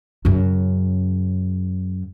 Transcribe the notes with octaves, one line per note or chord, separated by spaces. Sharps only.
F#2 C#3